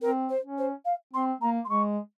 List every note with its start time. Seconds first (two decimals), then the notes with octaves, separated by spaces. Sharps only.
0.01 C4 A#4
0.29 C5
0.43 C#4
0.58 C5
0.85 F5
1.13 C4 C6
1.41 A#3 A#5
1.64 C6
1.69 G#3 C#6